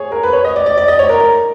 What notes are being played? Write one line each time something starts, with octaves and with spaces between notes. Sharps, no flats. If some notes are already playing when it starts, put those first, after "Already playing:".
Already playing: G#4 C#5
A#4
B4
C#5
D#5
D5
D5
D5
D#5
C#5
A#4
A#4